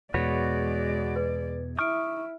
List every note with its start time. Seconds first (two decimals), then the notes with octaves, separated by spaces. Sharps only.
0.14 E2 B2 G#3 F#4 B4 C#5 D5
1.16 B4
1.79 E4 C#6 D#6 F6 D7